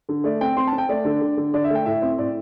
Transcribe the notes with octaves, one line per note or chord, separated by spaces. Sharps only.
D3
A3 D5
C4 G5
C4 C6
A5
C4
G5
A3 D5
D3
D3
D3
D3 D5
E5
A3 G5
A2 E5
C4
A2 D5